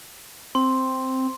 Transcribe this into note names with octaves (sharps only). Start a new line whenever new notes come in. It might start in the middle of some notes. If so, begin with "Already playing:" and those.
C4 C6